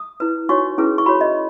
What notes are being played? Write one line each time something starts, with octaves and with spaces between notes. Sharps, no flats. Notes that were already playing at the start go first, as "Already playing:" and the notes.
Already playing: D#6
E4 B4
D#4 F#4 C#5 C#6
C#4 E4 G#4 B4
C#6
F#4 C#5 B5
D#5